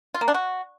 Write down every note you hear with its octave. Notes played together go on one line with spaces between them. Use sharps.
F4
A#3
D4
F#4